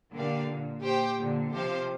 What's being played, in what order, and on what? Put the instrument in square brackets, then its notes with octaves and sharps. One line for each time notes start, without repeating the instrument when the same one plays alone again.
[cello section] A#2 D3 [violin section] A#3 G4 D5 F5
[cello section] A#2
[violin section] G4 C5 G5
[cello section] A#2 D3
[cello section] C3 F3 [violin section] G4 C5 F5